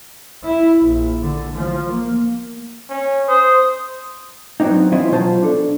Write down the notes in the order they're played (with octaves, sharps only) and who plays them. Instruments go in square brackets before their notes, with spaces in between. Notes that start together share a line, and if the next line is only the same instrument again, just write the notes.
[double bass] E4
A#1
D3
F3
A#3
[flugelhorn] C#4
[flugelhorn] C5 [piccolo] D#6
[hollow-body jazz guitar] F#3 B3 C4 D4 D#4
E3 F3 C#4 E4 C5 D#5
B2 F#3 F4 C5 A5 A#5
D4 A4